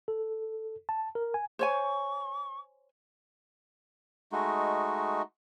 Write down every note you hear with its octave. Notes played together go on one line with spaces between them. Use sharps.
A4
A5
A#4
G#5
C5 C#5 G#5 C#6
G#3 A3 D#4 F#4